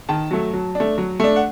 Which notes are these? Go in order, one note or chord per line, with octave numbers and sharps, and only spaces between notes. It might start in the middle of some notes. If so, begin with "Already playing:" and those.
D#3 A5
F#3 A3
F#3
A3 D4
F#3
A3 D4
F#5